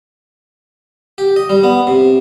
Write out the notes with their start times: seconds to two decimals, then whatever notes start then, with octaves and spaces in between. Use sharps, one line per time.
1.18 G4
1.36 D#5
1.49 G3
1.64 B3
1.87 C3